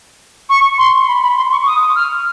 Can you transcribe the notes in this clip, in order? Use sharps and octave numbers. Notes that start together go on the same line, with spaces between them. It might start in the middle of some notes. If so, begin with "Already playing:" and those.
C#6
C6
B5
B5
C6
C#6
D#6
F6